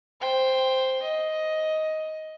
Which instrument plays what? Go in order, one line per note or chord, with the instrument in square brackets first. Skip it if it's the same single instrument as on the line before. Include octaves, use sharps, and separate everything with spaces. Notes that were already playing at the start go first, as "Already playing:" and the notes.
[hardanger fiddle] C5 G5
D#5